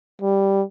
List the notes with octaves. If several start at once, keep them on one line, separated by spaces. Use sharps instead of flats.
G3